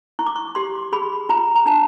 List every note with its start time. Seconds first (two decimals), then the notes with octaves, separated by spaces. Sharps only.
0.19 E4 C#6
0.27 D6
0.36 C#6
0.55 G4 C6
0.92 G#4 B5
1.29 F4 A#5
1.56 A#5
1.66 D4 A5